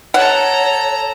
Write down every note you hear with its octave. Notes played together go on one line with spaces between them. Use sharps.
A4 C#5 F#5 A#5